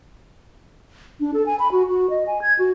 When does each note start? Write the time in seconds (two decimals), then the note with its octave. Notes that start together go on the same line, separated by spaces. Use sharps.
1.20 D4
1.34 A4
1.46 G#5
1.59 B5
1.72 F#4
1.89 F#4
2.10 D#5
2.27 G#5
2.42 G#6
2.59 F#4